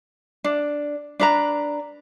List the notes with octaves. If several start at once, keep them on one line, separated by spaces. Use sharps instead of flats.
D4
D4 B4 A#5